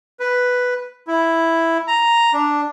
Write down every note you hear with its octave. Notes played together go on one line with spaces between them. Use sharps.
B4
E4
A#5
D4